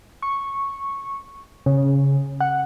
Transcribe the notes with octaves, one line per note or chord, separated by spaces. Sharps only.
C#6
C#3
F#5